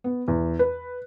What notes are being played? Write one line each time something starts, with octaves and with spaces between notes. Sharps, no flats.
B3
E2
B4